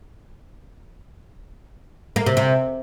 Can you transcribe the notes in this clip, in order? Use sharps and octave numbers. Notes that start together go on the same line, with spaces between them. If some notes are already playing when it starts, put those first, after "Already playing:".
A#3
C3
C3